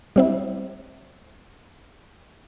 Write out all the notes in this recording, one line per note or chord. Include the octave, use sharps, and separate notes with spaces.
G3 C4 E4